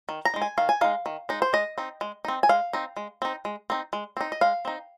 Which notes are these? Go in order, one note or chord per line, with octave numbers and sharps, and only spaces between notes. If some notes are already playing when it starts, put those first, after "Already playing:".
D#3
A#5
G#3 D#4
G#5
D#3 F5
G#5
G#3 D#4 F5
D#3
G#3 D#4
C5
G#3 D#5
C4 D#4
G#3
C4 D#4
G#5
G#3 F5
C4 D#4
G#3
C4 D#4
G#3
C4 D#4
G#3
C4 D#4
D#5
G#3 F5
C4 D#4